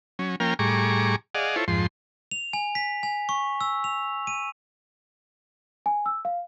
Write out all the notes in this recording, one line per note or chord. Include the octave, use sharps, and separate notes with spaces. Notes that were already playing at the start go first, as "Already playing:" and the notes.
F#3 C#4
F3 A#3 C#4 A#4 G5 F6
A2 G3 G#4 A#5 C#6 D6
G#4 D5 D#5 F5 F#5
E4 F4 A4 C5 C#5
F2 G#2 F3 C6
F7
G#5
B6
G#5
C#6
E6
F7
D#7
G#5
E6
F5